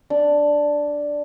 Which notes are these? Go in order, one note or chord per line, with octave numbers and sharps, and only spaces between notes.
D4